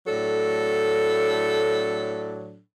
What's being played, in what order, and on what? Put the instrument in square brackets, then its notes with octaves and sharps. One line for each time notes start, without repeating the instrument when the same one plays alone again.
[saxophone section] A2 F#3 D4 A4